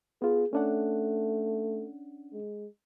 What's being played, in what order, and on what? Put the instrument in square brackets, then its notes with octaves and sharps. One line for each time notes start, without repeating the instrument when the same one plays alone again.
[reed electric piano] B3 F4 [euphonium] G#4
[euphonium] A3 [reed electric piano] C#4 D4 F#5
[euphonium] G#3